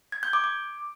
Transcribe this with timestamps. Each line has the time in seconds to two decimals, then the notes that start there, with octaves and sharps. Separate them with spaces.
0.12 G#6
0.23 G6
0.33 D6
0.44 D6